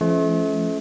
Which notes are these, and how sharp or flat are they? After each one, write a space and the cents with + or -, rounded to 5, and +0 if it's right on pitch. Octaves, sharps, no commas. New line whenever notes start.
F3 -40 A3 -40 C#4 +0